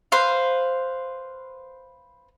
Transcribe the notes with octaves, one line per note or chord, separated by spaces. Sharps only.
B4 C5 F5